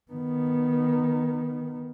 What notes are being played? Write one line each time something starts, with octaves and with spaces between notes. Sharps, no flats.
D#3 B3